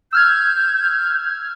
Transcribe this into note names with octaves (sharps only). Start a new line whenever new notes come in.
E6 F6 G6 G#6